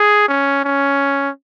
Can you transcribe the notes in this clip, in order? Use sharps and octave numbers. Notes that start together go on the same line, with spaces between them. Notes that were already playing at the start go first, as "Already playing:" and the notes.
Already playing: G#4
C#4
C#4